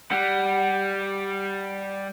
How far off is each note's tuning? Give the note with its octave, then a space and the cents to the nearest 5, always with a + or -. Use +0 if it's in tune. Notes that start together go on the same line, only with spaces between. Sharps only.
G3 +0 F#5 +25